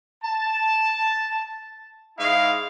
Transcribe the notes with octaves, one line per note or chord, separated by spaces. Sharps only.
A5
G#2 E4 D#5 F5